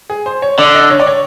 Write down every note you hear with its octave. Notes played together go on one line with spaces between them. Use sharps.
G#4
C5
C#5
D3 D5
D#5
C#5
D5
C#5